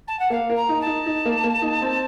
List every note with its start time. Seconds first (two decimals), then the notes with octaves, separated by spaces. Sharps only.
0.07 A5
0.19 F#5
0.30 A#3 F5
0.50 A#4
0.55 A#5
0.69 D#4
0.81 A5
0.87 D#4
1.06 D#4
1.25 A#3
1.44 A#3
1.62 D#4
1.82 C4